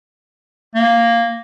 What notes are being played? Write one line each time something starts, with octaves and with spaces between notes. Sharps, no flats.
A#3